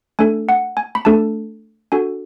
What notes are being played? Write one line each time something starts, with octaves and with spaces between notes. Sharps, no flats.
A3 D4 A4 G#5
F#5
G#5
B5
A3 D4 A4 A5
D4 F#4 A4 G#5